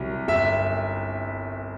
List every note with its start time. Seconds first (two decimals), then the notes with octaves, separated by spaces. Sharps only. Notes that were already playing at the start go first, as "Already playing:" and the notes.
Already playing: C2 F#3
0.28 G1 E5